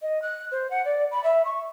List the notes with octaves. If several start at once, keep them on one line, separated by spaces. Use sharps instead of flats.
D#5
F#6
C5
F#5
D5
B5
E5
C#6